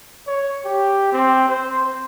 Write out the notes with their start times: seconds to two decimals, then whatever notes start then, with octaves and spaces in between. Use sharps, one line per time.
0.27 C#5
0.65 G4
1.12 C4
1.48 C5